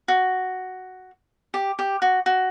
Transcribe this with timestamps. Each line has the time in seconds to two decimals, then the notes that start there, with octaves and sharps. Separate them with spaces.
0.08 F#4
1.54 G4
1.79 G4
2.02 F#4
2.26 F#4